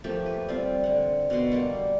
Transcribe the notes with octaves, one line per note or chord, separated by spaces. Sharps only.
F3 A3 A#3 G4
B4
G3 C4 F4
D3 F#5
B2 D5 F#5 C6
G3 A#3 F#5